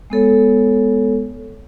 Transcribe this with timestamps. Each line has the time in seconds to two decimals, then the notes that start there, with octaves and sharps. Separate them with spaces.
0.10 G#3 B3 A4 C#5